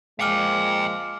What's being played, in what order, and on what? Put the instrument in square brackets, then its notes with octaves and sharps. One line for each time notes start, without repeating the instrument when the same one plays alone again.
[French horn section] A#2 F3 G#3 [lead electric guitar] F5 G5 [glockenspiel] G#5 D6 F6